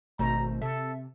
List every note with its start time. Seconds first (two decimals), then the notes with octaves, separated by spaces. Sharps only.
0.19 G#1 B2 A3 C5 A#5
0.62 C3 A4 E5